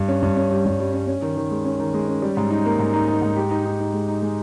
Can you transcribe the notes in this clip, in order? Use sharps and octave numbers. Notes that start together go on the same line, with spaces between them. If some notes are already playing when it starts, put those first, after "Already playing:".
Already playing: G2
C#4
G2
C#4
G3
G2
G3
C#4
C#4
D#3
D#3
G#3
C#4
D#3
G#3
C#4
G3
G#2
D#4
A#3
G#2
D#4
D#4
G#2
G4
D#4
D#4
D#4
G#3
D#4
G#3